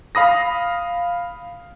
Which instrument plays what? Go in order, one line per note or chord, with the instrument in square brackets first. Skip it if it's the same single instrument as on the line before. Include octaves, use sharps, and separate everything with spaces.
[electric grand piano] F5 B5 D#6 A#6